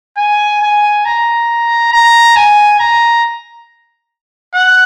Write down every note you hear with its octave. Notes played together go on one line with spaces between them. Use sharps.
G#5
G#5
A#5
A#5
G#5
A#5
F#5